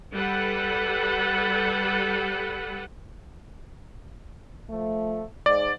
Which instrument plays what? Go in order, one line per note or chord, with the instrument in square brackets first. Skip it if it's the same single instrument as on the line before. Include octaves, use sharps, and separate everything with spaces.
[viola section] G3 A4 B4 F#5
[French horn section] F3 A3
[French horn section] G#2 [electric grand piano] D5